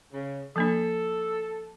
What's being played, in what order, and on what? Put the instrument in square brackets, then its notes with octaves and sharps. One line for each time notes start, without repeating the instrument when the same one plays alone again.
[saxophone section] C#3
[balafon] F3 A#3 D4 [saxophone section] A4